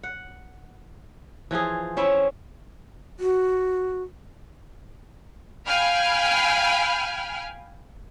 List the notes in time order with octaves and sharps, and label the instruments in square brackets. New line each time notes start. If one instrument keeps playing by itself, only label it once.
[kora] F#5
E3 F3 F4 G#4
C4 C#4 E4 E5
[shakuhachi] F#4
[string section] F5 G5 G#5 B5 F6